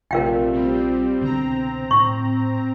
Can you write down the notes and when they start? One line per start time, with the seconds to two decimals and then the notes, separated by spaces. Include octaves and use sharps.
0.11 A#1 C3 A3 F4 A#4 D5 F5 G5
0.53 G3 C4
1.21 C2 B2 D3 C4 A#5
1.91 A2 C#6